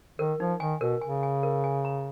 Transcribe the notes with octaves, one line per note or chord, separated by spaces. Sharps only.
D#3 A#4
F3 D#4
D#3 G#5
B2 A#4
C#3 G#5
G#5
A#4
G#5
A#5